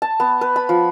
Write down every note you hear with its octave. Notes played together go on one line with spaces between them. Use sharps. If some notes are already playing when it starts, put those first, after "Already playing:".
A5
B3
B4
B5
F3